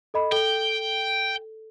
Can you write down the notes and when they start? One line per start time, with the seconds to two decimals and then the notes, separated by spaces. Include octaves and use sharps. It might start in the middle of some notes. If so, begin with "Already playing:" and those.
0.14 A4 D#5 B5
0.32 A4 G5 G7